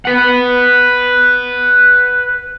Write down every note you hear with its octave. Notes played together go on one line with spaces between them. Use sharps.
B4 F#5